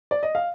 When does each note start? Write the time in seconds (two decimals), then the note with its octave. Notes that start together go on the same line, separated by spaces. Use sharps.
0.11 D5
0.23 D#5
0.35 F5